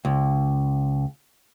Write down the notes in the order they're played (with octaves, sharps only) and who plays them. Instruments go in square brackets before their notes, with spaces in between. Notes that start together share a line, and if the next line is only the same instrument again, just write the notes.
[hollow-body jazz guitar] C#2